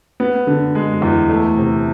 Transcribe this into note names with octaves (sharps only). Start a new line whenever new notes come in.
B3
D3
G#3
E2
A3
C3